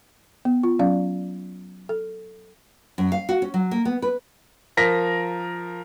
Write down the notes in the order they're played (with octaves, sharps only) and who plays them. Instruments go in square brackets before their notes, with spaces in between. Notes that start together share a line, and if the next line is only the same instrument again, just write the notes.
[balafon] B3
F4
F#3 C#4 D5 F5
A4
[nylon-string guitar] F#2
F5
F#4
C#4
F#3
A#3
B3
B4
[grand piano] F3 A#4 A#6 B6